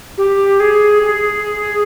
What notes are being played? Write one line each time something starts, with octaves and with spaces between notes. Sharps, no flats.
G4
G#4
G#4